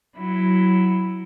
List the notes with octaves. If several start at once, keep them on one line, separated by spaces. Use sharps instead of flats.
F#3 E4